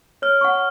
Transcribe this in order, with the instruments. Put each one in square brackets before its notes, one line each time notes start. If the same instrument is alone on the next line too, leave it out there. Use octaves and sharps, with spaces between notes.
[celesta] C#5 [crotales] F6
[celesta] F#5 C#6